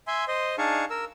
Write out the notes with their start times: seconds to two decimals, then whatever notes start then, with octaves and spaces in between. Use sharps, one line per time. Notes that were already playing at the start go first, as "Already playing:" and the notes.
0.07 E5 G#5 C6
0.28 C5 D#5 C6
0.58 D4 D#4 G#4 F5 A5 C#6
0.90 A#4 E6